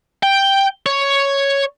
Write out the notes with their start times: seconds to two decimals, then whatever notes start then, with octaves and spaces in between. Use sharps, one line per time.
0.23 G5
0.86 C#5